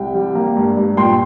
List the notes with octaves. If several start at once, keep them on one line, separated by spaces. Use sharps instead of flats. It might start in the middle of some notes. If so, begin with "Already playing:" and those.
Already playing: C2 G5
G3
A#3
G2
G2
A#2 G5 C6